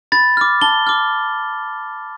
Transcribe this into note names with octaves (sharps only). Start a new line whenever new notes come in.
B5 A6
D6 F6
A5 G7
D6 F6